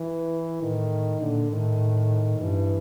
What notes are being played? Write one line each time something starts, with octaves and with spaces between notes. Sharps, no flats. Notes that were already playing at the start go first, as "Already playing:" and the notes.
Already playing: E3
A2 D#3
A#2 D3
A2 D#3
G2 E3